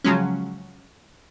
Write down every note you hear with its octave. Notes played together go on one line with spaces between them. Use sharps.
C#3 F3 F#3 G#3 C#4